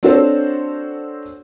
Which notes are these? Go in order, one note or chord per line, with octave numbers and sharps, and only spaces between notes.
C4 D4 F#4 A4 C5 C#5